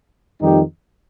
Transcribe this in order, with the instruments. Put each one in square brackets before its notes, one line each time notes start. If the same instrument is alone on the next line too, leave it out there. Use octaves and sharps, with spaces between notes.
[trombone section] F2 D#3 G3 D#4 G4